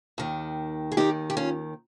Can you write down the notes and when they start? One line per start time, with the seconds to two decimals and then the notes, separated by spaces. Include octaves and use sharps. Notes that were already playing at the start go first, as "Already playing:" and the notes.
0.18 D#2 D#3
0.92 G#4
0.97 D#2 D#3 D#4 G4
1.30 G4
1.37 C#4 F4